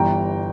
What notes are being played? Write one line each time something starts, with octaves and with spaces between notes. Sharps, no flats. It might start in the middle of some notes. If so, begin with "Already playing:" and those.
Already playing: G1 G2 E3 G5 A#5